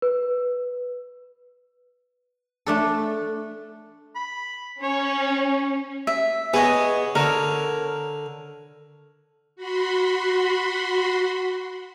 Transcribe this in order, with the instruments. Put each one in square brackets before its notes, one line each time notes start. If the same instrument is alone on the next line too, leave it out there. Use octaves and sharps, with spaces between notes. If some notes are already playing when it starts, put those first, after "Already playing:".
[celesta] B4
[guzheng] A3 D4 A4
[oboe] B5
[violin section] C#4 [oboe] C#5
[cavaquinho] E5
[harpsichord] B3 [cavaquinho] G#4 C#5 D#5
[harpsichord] D3 [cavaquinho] A#4 C#5
[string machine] F#4 B5 C6